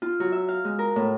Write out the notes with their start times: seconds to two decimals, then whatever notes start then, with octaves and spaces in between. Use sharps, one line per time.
0.02 F4
0.20 F#3
0.32 E5
0.49 F5
0.65 G#3
0.79 A#4
0.96 A2